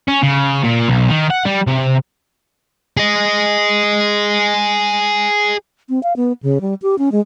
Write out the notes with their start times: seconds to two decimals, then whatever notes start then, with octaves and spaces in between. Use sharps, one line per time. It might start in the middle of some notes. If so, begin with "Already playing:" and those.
0.08 C#4
0.22 C#3
0.63 A#2
0.88 B1
1.09 D#3
1.30 F#5
1.45 G3
1.67 C3
2.97 G#4 D#5
5.89 C4
6.03 F5
6.16 B3
6.43 C#3
6.61 G3
6.82 G4
6.98 C#4
7.12 G#3